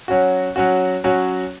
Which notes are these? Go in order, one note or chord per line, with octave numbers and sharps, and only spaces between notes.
F#3 C#4 F#4
F#3 C#4 F#4
F#3 C#4 F#4